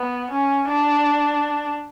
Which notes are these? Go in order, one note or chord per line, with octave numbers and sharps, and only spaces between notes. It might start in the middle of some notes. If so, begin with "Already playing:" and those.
Already playing: B3
C#4
D4